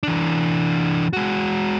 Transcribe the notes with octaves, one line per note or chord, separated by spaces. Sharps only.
E3 D4
G#3 F#4